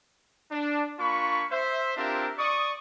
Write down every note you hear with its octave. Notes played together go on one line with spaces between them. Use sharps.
D4
A#3 D4 F4 B5 C#6
C5 E5
C4 D4 F4 G4 A#4 E5
D5 C#6 D#6